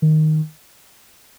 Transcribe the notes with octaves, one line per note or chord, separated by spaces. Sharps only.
D#3